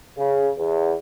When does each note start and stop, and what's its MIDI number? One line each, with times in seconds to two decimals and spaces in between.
0.17 0.49 49
0.57 0.94 40